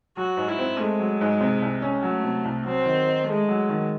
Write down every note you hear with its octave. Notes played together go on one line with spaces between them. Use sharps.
F#3 F#4
G#2
E4
C4
G#3 A3
F#3
G#2
C3
C2
C#4
F#3 A3
C3
C2
F#3 C4
D#3
D#4
G#3 A3
F#3
D#3